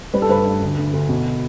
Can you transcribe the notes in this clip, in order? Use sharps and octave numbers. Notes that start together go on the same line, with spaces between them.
G3 B4
A4
G2 B4
G2
D2
D2
D2
B2